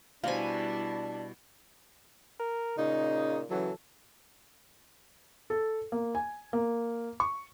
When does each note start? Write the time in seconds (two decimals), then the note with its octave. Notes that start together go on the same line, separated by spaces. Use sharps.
0.24 B2 G3 D4 E4 C5 F5 G#5
2.39 A#4
2.78 A#2 C#3 D#4
3.51 C#3 E3 F#3 A4
5.50 A4
5.92 A#3
6.15 G#5
6.53 A#3
7.20 C#6